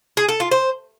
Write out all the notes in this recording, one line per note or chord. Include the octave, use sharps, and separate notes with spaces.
G#4
A4
F4
C5